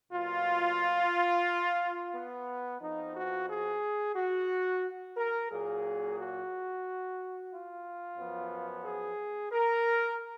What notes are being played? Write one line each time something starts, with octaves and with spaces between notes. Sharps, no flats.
B2 F#3 A#3 F4
B3
F2 F3 B3 D#4
F#4
G#4
F#4
A#4
A#2 F#3 A#3 G#4
F#4
F4
F#2 F3 B3
G#4
A#4